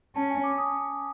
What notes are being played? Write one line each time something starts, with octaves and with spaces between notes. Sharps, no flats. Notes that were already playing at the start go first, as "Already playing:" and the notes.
C#4 A5
G#5
D6
D#6